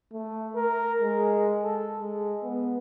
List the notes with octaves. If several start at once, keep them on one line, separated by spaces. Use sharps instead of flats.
A3
A#4
G#3
A4
G#3
B3